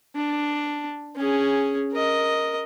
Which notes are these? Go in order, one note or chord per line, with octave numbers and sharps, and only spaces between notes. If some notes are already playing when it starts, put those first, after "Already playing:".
D4
C#4 G#4
A#4 D#5